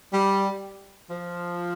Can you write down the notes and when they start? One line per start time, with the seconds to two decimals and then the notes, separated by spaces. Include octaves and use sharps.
0.12 G3
1.11 F3